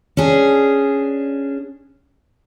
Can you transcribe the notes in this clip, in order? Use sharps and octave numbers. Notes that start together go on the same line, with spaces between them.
C#4 D4 G#4